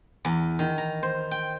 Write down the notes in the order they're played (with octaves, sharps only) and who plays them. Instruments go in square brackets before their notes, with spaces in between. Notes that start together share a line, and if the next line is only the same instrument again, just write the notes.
[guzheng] E2
D#3
A#5
C5
G5